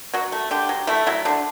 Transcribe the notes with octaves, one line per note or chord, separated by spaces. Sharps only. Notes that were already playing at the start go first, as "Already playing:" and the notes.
F#3 F#4
A3
D3 G4
F#3
A3 E4
F#3 E4
D3 D4